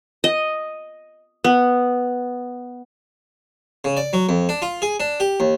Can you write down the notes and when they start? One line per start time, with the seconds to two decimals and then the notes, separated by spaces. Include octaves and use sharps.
0.24 D#5
1.44 B3
3.84 C#3
3.97 D5
4.13 F#3
4.29 F2
4.49 D4
4.62 F4
4.82 G#4
5.00 D4
5.20 G4
5.40 D#2